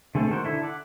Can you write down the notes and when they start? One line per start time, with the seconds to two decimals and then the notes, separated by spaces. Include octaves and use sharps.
0.15 D3 G#3 A3 C4 A4
0.30 D#3 F#4 A#4 C5
0.44 D3 E4 A4
0.63 F#5 D6